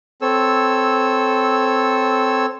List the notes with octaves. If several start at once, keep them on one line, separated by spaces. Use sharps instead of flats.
C4 A4 C#5 E6